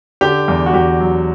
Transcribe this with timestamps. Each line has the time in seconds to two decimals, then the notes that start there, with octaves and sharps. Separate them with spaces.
0.21 D3 G4
0.48 E2
0.66 F#4
0.74 E2 G4
1.00 F#3